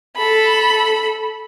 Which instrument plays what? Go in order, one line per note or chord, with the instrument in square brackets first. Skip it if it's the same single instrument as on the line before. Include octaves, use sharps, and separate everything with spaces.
[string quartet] A4 B5